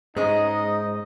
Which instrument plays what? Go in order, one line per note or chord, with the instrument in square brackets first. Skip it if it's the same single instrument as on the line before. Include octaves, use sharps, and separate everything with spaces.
[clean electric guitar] G#2 [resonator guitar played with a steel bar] G#3 C#4 G#4 [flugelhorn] D#4 [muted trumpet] D#5